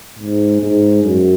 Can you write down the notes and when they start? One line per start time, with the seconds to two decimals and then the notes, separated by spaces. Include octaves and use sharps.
0.19 G#2
0.61 G#2
1.04 F#2